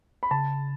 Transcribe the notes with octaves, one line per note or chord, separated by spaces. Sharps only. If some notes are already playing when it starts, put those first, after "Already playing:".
B5
C#3 A5